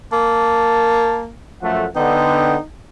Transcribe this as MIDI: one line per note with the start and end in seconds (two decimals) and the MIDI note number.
0.13 1.32 58
0.13 1.22 81
1.62 1.86 42
1.62 1.86 53
1.62 1.86 57
1.62 1.87 78
1.96 2.56 50
1.96 2.56 59
1.96 2.63 63
1.96 2.57 79